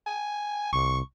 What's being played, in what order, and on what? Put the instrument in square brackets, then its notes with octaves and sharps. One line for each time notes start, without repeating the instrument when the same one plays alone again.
[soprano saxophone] G#5
[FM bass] C2 [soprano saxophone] C#6